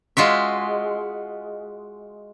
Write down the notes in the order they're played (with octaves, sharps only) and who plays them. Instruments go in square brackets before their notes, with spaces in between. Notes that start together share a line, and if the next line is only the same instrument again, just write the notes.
[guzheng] G#3 F4 F#4 E5